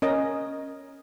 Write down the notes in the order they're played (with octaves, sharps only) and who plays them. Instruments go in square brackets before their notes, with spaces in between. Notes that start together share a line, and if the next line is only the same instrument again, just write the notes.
[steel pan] C#4 A#4 D#5